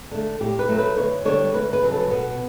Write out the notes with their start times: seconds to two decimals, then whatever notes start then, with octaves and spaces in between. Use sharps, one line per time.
0.11 D3 A3
0.40 A2 G4
0.59 B4
0.69 F#3 A3
0.78 B4
0.97 D2 C#5
1.25 D3 G3 C#5
1.54 D2 B4
1.73 B4
1.83 C#3 F#3
1.92 A4
2.11 B2 B3